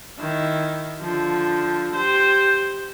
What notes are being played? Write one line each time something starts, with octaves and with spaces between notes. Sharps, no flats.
D#3 E4
D3 F3
G4 C5